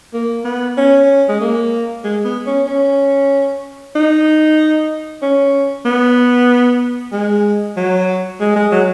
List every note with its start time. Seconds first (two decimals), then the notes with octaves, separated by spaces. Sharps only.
0.13 A#3
0.44 B3
0.77 C#4
1.29 G#3
1.40 A#3
2.04 G#3
2.25 B3
2.46 C#4
2.67 C#4
3.95 D#4
5.22 C#4
5.85 B3
7.12 G#3
7.77 F#3
8.40 G#3
8.55 G#3
8.72 F#3